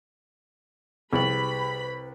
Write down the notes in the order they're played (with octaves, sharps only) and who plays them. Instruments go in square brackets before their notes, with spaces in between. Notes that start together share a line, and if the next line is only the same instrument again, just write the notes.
[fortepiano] C2 [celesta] G#4 F#7 [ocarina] B4 [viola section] B5